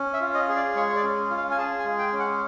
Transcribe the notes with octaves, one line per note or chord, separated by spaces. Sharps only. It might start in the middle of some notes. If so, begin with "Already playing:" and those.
Already playing: C#4
E5
F4
D#5
G#4
D5
G#3 C#5
C#5
D5
C#4
F4
F5
G#5
G#4 A5
G#5
G#3
G5
C#4
F#5